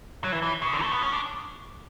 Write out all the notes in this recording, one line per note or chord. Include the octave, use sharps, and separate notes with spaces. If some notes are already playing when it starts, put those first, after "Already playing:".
F#3
E3
E3
C#3
D3
A3
B3
C#4
D4